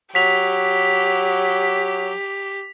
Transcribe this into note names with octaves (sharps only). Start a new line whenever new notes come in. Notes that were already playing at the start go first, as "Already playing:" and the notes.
F#3 G4 B6 F7